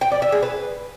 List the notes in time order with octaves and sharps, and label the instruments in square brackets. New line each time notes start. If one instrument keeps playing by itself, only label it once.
[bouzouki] G5
D5
E5
G#4
B4